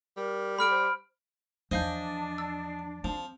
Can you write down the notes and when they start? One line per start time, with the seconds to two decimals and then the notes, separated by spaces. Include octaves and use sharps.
0.17 G3 A#4
0.59 A4 B5 F6 D7
0.70 C5
1.71 E2 F3 D4 C5 D#5 F5 G#5 G6
2.38 E6
3.04 F3 C4